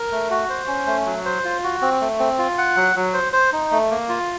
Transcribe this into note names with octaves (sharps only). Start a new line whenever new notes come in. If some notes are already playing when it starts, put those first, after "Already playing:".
Already playing: A#4
A3
F#4
C5
C#4
A3
F#3
C5
F4
F#4
C4
A3
C4
F4
F#5
F#3
F#3
C5
C5
D#4
A3
A#3
F4